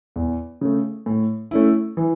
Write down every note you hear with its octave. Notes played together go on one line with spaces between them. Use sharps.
E2
C#3 A3
A2
A3 C#4 E4
E3